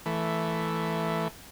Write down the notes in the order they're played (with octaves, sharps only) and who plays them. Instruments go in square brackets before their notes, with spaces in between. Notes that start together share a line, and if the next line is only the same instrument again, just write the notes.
[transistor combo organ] E3 A3